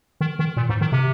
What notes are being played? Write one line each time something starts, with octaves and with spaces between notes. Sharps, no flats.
D#3
D#3
A#2
G#2
D#3
C3